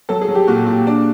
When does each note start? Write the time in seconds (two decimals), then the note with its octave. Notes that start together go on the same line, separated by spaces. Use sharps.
0.09 F#3 A4
0.22 G#4
0.28 F#3
0.35 G4
0.47 A#2 F#4
0.66 A#2
0.87 D4